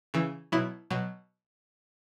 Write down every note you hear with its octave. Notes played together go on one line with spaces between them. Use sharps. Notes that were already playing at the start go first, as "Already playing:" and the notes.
C#3 E3
B2 F#3 E4
B2 F#3